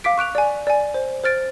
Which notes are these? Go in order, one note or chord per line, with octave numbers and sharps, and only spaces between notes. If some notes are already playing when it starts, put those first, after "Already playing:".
F5 D6 B6 D7
C#6 F#6 D7 F7
D5 G#5
D5 G#5
C5
C5 F6 A6 D7